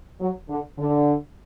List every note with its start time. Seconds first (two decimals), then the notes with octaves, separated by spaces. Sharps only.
0.20 F#3
0.49 D3
0.77 D3